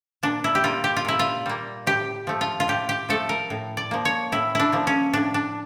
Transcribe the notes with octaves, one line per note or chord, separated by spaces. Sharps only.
A#2 D4
E4
G4
G3 A#3 F4
G4
F4
A#2 E4
F4
G3 A#3
A2 G4
F3 A3
F4
F4
A2 G4
G4
F3 A3 A4
A#4
A2
D5
F3 A#3
C#5
A2 E4
D4 E4
F3 A#3
C#4
A2 D4
D4